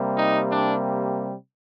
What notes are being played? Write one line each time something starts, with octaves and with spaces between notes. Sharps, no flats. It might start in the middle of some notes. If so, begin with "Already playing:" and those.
Already playing: C3 G3 A#3
D#4
D4